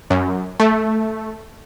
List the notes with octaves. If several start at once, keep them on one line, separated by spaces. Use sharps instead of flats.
F#2
A3